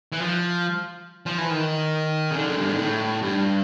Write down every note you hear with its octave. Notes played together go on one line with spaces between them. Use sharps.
E3
F3
F3
E3
D#3
C#3
D3
F#2
G2
G#2
A2
G2